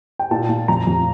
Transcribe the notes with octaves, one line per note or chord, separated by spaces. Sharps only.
G5
A#2 A5
A#2
F2 A#5
F2